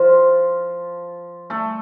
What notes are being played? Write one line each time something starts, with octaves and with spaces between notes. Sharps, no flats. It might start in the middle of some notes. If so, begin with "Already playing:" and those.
Already playing: F3 F4
A3 A4